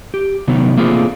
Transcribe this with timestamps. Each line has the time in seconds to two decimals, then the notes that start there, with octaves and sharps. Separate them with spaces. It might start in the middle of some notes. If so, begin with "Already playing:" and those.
0.14 G4
0.48 C3 D#3 F#3 B3
0.77 A3 A#3 C4 F4 G#4